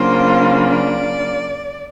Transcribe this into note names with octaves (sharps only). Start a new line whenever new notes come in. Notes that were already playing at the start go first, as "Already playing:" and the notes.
Already playing: C#3 F#3 A#3 D4 F4 C5
D5